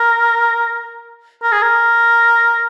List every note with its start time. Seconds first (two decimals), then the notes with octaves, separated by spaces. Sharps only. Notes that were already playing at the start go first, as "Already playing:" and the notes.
Already playing: A#4
1.43 A#4
1.52 G#4
1.63 A#4